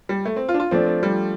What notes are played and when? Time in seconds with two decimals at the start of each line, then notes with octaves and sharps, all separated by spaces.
0.09 G3
0.25 A3
0.36 C4
0.49 F4
0.54 D4
0.60 F4
0.71 F3 A3 C4 D4
0.87 C4
1.03 G3